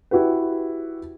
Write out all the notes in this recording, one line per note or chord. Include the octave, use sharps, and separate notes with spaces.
E4 F#4 G4 B4